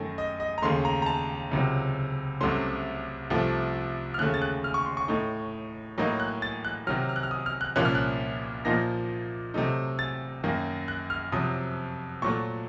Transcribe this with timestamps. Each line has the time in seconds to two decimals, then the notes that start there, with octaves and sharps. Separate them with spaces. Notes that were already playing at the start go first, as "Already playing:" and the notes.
Already playing: F#2 D#3 A3
0.18 D#5
0.40 D#5
0.58 A#5
0.62 D#2 C#3 A3 C6
0.85 A#5
1.02 A#5
1.06 A5
1.51 C#2 C3 D#3 F#3
2.41 C2 C3 F#3 A3 C#4 C6
3.30 C2 C3 F3 A3
4.14 F6
4.19 D#2 C#3 A3 F#6
4.34 A6
4.42 F#6
4.64 F6
4.74 C#6
4.86 C6
4.97 C#6
5.08 A2 A3 D#4
5.98 A2 F#3 A#3 D#4
6.20 F#6
6.42 A6
6.65 F#6
6.87 C3 D#3 F#3 F6
7.09 F6
7.16 F#6
7.23 F6
7.31 D#6
7.46 F6
7.61 F#6
7.76 C2 A#2 F3 A#3 C#4 F#6
7.85 F6
7.95 F#6
8.65 A#2 F3 A#3 D#4 A#6
9.54 C3 F#3 A3 D#4
9.99 A6
10.44 F#2 D#3 A#3
10.88 F#6
11.10 F6
11.32 F2 C3 F#3 D#6
12.22 A#2 F#3 A3 C#6